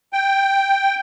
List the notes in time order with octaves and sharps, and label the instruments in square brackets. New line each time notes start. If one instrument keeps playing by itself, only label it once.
[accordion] G5